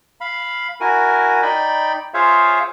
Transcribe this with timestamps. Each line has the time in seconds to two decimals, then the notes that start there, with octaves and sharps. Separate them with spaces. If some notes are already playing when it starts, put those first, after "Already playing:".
0.21 F5 B5
0.81 E4 F#4 A#4 G#5
1.42 D#4 D5 G5 B5
2.14 F4 G#4 C5 C#5 E5 F5